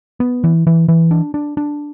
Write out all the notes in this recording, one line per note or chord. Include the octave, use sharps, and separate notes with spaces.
B3
E3
E3
E3
D4
D4
D4